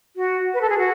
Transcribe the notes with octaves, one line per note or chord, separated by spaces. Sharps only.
F#4
B4
A4
G#4
F#4